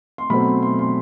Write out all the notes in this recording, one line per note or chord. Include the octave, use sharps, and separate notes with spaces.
C6
B2 F#3 A3 C4 B5
C6
C6